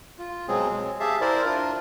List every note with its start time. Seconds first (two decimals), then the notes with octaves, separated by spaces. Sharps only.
0.18 F4
0.48 B2 F#3 G#3 C4 G#4
0.70 G#3
1.00 G4 G#4 E5 F5 A5
1.21 E4 A#4 C5 D5
1.45 D4 F4 A#4